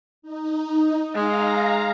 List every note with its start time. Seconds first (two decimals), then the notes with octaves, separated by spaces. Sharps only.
0.22 D#4
1.15 G#3 F5 A#5